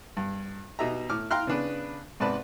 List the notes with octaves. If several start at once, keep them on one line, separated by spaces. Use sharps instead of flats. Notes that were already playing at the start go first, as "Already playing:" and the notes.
G2
B2 D#4 G4 E5 A#5
A2 D6 F6
F5 G5 A#5 C6 F6 F#6
C#3 B3 D4 B4
G#2 C3 B4 D5 A5 B5